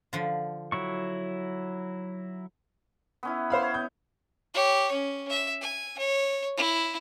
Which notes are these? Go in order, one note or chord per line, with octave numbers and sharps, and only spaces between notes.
D3 F3
F#3 E4 C#6
B3 C#4 E4
C5 F5 B5
C#5
B3 G6
G4 C#5
C#4
E5
G#5
C#5
E4